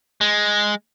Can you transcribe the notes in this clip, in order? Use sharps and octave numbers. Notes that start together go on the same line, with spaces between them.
G#3